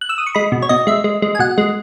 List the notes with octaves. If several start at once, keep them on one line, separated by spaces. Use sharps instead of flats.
F#6
E6
D#6
C#6
G#3 B5
B2
C#5
B2 D#5
G#3 E5
G#3
G#3
G#5
B2 F#5
G#3